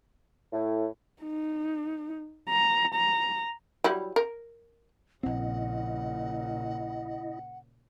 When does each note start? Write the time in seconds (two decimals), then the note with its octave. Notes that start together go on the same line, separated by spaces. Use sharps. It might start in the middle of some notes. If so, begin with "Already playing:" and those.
0.52 A2
1.23 D#4
2.49 A#5
2.95 A#5
3.84 F#3 G3 E4
4.16 A#4
5.23 A#1 A#2 C#3 C4 E4 D#5 F#5